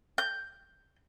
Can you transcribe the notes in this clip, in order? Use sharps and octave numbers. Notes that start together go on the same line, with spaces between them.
G6